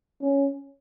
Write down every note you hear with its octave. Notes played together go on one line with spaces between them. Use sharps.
C#4